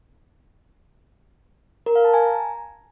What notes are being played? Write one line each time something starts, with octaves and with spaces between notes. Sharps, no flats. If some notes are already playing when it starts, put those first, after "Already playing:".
A#4
F5
A5
G#5
A#5